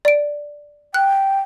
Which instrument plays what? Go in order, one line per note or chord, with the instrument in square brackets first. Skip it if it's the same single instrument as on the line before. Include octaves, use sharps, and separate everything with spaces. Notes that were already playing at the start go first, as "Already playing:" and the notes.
[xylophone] D5 D7
[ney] G5 [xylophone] F#6